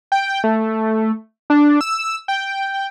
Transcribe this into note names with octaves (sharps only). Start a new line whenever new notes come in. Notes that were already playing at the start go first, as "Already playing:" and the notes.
G5
A3
D4
E6
G5